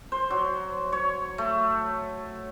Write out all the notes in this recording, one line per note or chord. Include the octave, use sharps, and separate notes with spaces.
C5
F#3
C#5
A3